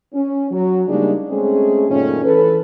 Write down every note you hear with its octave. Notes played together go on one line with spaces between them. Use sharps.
C#4
F#3
C#3 G3 G#3 A#3 D4 D#4
G#3 A3 C4 C#4 G#4
F#2 A#2 D#3 A3 C#4
E3 A4 B4